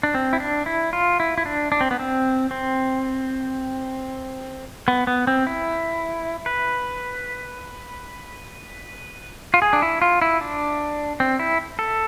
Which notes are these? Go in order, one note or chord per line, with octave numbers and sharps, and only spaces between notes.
D4
C4
E4
D4
E4
F4
E4
E4
D4
D4
C4
B3
C4
C4
B3
B3
C4
E4
B4
F4
G#4
D4
E4
F4
E4
D4
C4
E4
A4